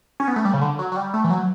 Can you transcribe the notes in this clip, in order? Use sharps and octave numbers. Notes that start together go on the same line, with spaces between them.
C#4
B3
A3
G3
C#3
D3
F#3
F#3
G3
A3
E3
F#3